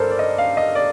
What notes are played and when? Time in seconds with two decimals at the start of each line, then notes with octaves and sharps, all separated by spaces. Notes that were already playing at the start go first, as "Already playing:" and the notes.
Already playing: G2 A4 A#4 C5
0.11 D5
0.19 D#5
0.38 F5
0.57 D#5
0.75 D5